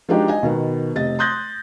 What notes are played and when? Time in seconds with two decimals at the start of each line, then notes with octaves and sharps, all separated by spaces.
0.09 F3 G#3 D4 D#4 F#4 G4
0.28 D#5 G#5
0.43 B2 D#3 B3
0.95 F1 C3 D#5 A6
1.19 C6 D#6 F#6 G6 A6 A#6